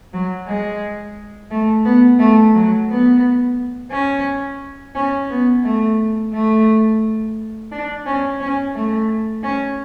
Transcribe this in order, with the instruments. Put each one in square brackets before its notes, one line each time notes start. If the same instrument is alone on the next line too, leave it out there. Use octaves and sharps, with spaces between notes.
[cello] F#3
G#3
A3
B3
A3
F#3
B3
C#4
C#4
B3
A3
A3
D4
C#4
C#4
A3
C#4